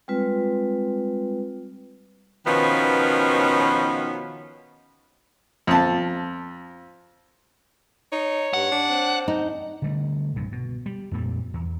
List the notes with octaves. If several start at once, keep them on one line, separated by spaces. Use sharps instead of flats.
G3 G#3 C4 F4 B4
B2 D#3 F3 B3 C#4 D#4
F2 A5
D#4 C#5
G2 F#5
D4
C4
D#4
D3 G3 A3
C2 G2 A#2
B2
G3
F2 A#2 F3 G3
E2